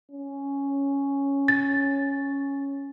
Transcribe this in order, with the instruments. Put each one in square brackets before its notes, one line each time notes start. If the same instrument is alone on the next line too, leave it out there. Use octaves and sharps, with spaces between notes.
[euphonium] C#4
[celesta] A6